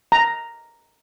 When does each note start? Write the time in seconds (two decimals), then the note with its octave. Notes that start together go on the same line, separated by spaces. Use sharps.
0.12 A#5